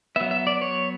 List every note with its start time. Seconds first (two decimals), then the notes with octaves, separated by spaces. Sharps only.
0.16 F#3 B3 E5
0.31 E5
0.47 D5
0.62 C#5